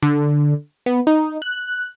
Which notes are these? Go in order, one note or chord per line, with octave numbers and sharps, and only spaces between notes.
D3
B3
D#4
F#6